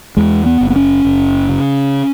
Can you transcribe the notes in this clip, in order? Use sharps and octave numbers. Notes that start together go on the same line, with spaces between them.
E2 G#3
B3
F#1
B3
C#4
F#1
C#3